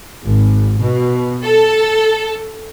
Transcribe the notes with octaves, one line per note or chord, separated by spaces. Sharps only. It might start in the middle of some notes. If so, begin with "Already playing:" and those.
G#1
B2
A4